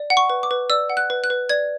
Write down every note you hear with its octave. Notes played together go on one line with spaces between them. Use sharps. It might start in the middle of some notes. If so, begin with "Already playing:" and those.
Already playing: D5
F#5
C#6
B4
D6
B4
D5 E6
F#5
F#6
B4
F#6
B4
D5 G#6